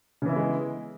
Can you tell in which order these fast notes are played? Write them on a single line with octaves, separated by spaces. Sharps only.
C#3 E3 E4 B3 G#3